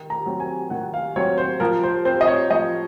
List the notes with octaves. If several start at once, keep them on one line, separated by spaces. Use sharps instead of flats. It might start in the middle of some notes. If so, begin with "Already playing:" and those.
Already playing: D#3
A#5
F#3 C4
G#5
D#3 F#5
F5
F#3 C4 C#5
C5
F3 A#4
C5
C4 C5
D#5
C#5
F3 D#5